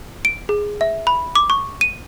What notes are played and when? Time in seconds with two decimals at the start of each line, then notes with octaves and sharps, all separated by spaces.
0.25 D7
0.49 G#4
0.81 E5
1.07 B5
1.35 D6
1.50 C#6
1.81 D#7